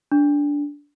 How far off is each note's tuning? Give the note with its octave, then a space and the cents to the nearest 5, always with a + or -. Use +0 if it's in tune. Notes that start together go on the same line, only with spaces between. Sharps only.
D4 -15